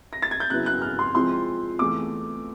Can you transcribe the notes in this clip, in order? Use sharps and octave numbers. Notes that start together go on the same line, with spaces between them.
A#6
A6
G#6
G6
C#3 F#3 B3 E4 F#6
F#6
F6
C6
C3 F3 G#3 C4 E4 C6
E2 C3 E3 A3 D6